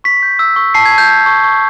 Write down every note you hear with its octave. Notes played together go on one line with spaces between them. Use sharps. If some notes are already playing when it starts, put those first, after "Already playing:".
C#6 B6
G6
E6
C#6
A5 C7
G#6
A5
G6
G6
C#6
C#6